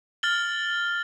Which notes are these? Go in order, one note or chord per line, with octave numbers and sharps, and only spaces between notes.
F6 A6 F#7 G7